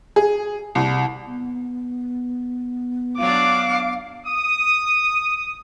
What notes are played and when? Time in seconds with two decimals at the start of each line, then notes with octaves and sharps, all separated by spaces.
0.16 G#4
0.75 C2
1.26 B3
3.19 F#3 D4 F5 D6
4.26 D#6